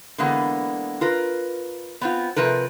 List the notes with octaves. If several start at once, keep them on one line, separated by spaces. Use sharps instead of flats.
D3 E3 G#3 A#3 B3
F4 A#4 B4
B3 C4 F4
C3 F3 A#4 B4